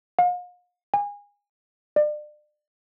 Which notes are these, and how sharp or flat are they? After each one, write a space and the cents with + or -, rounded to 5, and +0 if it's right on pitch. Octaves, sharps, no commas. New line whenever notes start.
F5 +45
G#5 -25
D5 +35